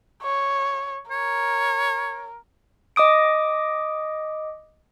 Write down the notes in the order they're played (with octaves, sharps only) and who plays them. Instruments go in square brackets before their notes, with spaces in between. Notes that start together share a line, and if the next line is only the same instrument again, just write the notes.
[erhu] C#5
[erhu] A#4 [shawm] C#5
[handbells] D#5 D6 D#6 D7